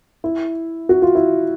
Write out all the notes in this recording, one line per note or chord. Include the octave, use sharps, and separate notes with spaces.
E4
F#4
F4
E4